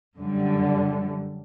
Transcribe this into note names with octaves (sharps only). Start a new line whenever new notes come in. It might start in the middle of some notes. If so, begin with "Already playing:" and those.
F#2 D3 G3